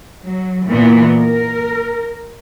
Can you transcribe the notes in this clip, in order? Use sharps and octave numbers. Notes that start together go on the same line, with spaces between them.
F#3
A#2 E3 A#3 B3
A#4